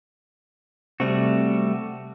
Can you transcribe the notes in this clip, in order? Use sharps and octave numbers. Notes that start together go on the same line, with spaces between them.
C3 G3 A3 C4 F#4